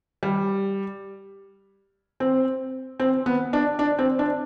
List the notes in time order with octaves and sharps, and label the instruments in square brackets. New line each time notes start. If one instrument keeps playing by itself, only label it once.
[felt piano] G3
C4
C4
B3
D4
D4
C4
D4